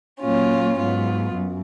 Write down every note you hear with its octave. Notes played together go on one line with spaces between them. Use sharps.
A#2 F#3 A#3 C#4 F4
G#2 F#3 B3 F4
F#2